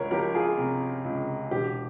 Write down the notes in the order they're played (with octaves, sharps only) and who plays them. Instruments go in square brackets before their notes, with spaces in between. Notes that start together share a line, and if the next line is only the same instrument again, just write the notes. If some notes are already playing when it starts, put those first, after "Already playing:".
Already playing: [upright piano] C#2 A#4 C#5
F3 G4 A#4
F4 G#4
C3
C#2
E1 G4